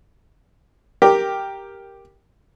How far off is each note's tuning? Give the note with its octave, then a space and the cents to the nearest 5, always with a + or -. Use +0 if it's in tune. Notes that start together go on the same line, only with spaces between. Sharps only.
G4 +0 A#4 +0